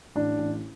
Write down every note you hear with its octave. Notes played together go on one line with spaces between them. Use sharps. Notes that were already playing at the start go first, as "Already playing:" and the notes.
A1 D4
A1